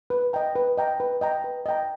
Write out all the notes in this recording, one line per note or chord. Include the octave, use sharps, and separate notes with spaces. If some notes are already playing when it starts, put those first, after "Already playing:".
B4
D#5 G5 A#5
B4
D#5 G5 A#5
B4
D#5 G5 A#5
B4
D#5 G5 A#5